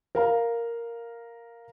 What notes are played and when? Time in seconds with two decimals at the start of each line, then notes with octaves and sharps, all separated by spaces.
0.15 A#4 F5 A#5